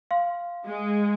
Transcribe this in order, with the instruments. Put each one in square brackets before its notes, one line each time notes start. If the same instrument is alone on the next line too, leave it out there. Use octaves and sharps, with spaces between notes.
[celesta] F5 C6
[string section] G#3